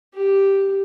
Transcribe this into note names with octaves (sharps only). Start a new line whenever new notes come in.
G4